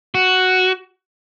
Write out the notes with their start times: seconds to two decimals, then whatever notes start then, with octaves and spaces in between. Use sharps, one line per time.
0.15 F#4